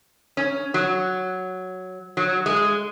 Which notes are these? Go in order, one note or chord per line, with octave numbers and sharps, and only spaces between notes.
C#4
F#3
F#3
G#3